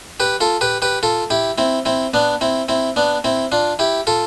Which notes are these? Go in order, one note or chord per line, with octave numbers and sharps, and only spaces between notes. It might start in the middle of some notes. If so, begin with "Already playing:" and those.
G4 B4
F4 A4
G4 B4
G4 B4
F4 A4
E4 G4
C4 E4
C4 E4
B3 D4
C4 E4
C4 E4
B3 D4
C4 E4
D4 F4
E4 G4
F4 A4